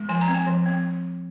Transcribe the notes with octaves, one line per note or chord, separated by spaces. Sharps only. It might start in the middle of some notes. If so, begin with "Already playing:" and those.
Already playing: G#3
F3 G#5
A#5
C4
G#5
F3
C4